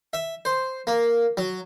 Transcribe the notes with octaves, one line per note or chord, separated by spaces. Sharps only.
E5
C5
A#3
F#3